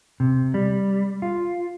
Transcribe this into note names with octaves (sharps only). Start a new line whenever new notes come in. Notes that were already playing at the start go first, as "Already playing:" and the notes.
C3
G3
F4